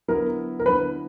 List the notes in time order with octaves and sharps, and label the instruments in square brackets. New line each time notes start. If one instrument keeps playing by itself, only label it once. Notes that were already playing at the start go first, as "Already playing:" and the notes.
[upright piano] D3 F#3 B3 E4 [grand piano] A#4
[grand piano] A#4
[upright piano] D3 F#3 B3 E4 [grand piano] B4